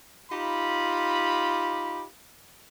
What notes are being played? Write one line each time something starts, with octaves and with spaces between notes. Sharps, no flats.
D#4 F4 G4 B5